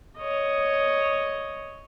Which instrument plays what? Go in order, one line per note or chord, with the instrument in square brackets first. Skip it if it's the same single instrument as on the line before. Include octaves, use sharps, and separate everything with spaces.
[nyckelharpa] C#5 D#5